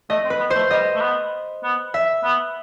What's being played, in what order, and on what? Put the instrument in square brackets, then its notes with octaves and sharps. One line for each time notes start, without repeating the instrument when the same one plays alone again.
[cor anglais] A3 [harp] D#5
[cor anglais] C4
[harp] B4
[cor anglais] B3
[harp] C5
[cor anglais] A3
[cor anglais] G3 [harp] D#5
[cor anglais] A3
B3
B3
[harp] E5
[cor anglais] B3